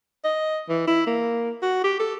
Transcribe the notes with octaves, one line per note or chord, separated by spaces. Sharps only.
D#5
E3
E4
A#3
F#4
G4
A4